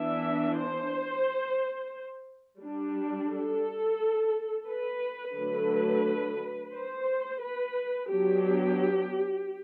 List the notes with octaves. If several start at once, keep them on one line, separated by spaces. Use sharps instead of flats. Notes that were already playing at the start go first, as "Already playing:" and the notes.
Already playing: E3 B3 D4 E5
C5
G3 D4
A4
B4
D3 F#3 A3 D4 B4
C5
B4
F#3 B3 D4 G4